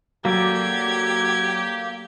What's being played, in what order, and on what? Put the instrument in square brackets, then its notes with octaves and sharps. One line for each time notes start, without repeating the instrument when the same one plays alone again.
[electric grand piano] F#3 [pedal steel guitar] A#3 A4 D5 [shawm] G4 [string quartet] G#6